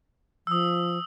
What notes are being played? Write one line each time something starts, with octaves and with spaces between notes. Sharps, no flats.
F3 D#6 E6